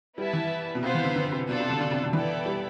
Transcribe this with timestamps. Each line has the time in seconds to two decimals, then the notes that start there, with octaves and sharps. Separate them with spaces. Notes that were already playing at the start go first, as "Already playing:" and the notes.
0.18 G3 B3 E4 B4 E5 A5
0.33 E3
0.75 B2
0.83 C3 B3 F4 C5 F5
0.95 E3
1.05 D3
1.16 D3
1.32 C3
1.49 B2 D4 F4 A4 D5
1.60 C3
1.70 D3
1.81 D3
1.91 C3
2.03 D3
2.13 E3 B3 E4 A4 D5 G5
2.46 G3